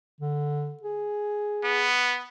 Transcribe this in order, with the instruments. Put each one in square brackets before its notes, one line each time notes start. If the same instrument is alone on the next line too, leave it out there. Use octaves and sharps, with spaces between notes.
[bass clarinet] D3
G#4
[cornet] B3